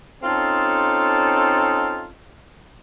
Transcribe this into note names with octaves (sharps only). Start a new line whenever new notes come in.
C4 C#4 D#4 F4 A4